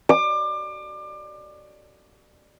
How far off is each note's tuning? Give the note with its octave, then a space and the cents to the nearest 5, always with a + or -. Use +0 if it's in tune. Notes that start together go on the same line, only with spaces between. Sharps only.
D6 +30